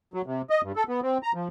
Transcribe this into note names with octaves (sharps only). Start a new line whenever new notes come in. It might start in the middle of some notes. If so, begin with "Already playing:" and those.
F#3
C3
D#5
G2
A4
B3
C4
A#5
F3